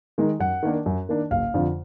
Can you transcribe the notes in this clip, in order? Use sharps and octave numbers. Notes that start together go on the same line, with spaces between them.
D#3 G#3 D#4
F#2 F#5
D#3 A#3 D4
F#2
D#3 A#3 D4
F#1 F5
F2 D3 F3